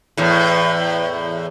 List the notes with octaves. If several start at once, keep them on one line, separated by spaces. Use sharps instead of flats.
E2 A2